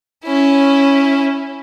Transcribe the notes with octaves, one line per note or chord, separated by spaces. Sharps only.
C#4 E4